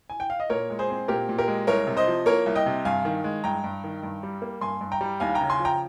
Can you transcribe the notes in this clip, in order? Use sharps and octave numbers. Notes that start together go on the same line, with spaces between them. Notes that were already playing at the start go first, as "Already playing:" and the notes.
G#5
G5
F5
D#5
A#2 A#4 C#5
G#3
G#4 C5
C4
A#2 G4 A#4
A#2
G4 A#4
G#3
C2 A#4 C#5
C3
C5 D#5
F3
A#3 A#4 C#5
C2
D#5 G5
C3
G2 F5 G#5
D#3
G#3
G2 G5 A#5
G2
D#3
G2
G3
A#3
G2 G#5 C6
G2
G5 A#5
G3
D#2 F5 G#5
G5 A#5
C#3
G#5 C6
F3
G5 A#5